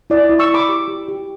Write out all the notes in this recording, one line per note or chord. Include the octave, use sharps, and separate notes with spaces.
E4 D5
E4
C#6 E6
E4
B5 D6
G4
G4
G4